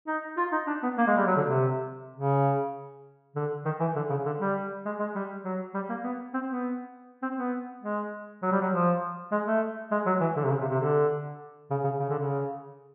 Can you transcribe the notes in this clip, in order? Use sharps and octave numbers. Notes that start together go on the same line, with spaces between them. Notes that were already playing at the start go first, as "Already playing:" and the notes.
D#4
F4
D#4
D4
B3
A#3
G#3
G3
F#3
D3
C3
C#3
D3
D#3
E3
D3
C#3
D3
G3
G#3
G#3
G3
F#3
G3
A#3
B3
C4
B3
C4
B3
G#3
F#3
G3
F#3
F3
G#3
A3
G#3
F#3
E3
D3
C3
C#3
C3
C3
D3
C#3
C#3
C#3
D3
C#3